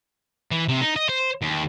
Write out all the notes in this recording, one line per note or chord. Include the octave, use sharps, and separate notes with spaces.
E3
C3
D#4
D#5
C5
D#2